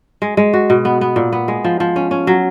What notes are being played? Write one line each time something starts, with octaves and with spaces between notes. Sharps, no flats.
G#3
G#3
F#4
B2
B3
B3
A#2
B3
G#3
F3
F3
C#4
C#4
F#3